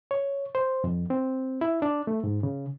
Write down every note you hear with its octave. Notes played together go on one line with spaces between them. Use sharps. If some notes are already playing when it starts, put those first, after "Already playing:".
C#5
C5
F2
C4
E4
D4
A3
G#2
C#3